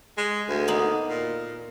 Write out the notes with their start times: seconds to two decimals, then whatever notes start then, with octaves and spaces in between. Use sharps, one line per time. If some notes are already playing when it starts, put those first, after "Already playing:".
0.17 G#3
0.48 D2
0.68 A#3 B3 D#4
1.08 A#2